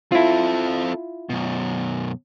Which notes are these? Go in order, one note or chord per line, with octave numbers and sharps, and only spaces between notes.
C4 E4 F4 A4
F#2 B2